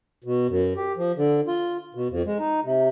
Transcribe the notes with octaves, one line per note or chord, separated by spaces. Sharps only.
B2
F#2
G4
F3
D3
F4
B2
F2
G#3
D#4
C3